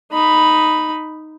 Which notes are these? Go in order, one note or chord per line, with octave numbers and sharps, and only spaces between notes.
D#4 B5